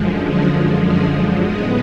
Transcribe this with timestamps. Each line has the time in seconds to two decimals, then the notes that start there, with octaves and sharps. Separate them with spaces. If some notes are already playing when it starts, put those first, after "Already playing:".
Already playing: F#2 D3 F3 G#3
0.28 G#4
0.84 G#4
1.39 A2 G#3 B3 G#4